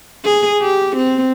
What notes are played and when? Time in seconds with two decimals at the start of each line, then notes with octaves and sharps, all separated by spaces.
0.25 G#4
0.61 G4
0.96 C4